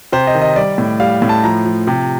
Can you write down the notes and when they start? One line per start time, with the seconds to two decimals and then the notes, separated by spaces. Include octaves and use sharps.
0.12 C3 C5
0.27 D#5
0.35 D#3
0.41 D#5
0.56 G3 D5
0.78 A2
1.00 G3 F5
1.22 A2
1.29 A5
1.44 F3 A#5
1.65 F3
1.87 C3